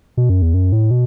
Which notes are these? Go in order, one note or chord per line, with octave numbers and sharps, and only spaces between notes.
B2
F#2
E2
F#2
A2
B2